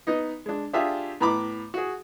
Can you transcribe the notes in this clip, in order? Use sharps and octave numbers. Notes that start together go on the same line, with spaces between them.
B3 D#4 D#5
G#3 D4
D4 F4 G4 G#4 E5
A2 B3 A#5 B5 D6
F#4 G#4